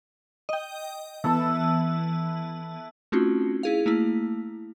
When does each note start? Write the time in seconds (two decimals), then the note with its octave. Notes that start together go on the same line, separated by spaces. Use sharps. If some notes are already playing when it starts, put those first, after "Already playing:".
0.49 D#5 G5
1.24 E3 B3 A4 E5 A5
3.12 A3 C4 C#4 D#4 F4 F#4
3.63 E4 G#4 F5
3.86 A3 A#3 E4